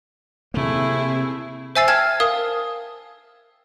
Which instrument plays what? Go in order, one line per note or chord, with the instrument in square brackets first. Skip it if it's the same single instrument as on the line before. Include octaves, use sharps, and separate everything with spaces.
[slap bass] C3 A#3 [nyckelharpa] A3 C4 [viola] E4 G#4
[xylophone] C5 E5 G#5 E6 A6 C7
G5 A5 F6 G#6
A#4 F5 D#6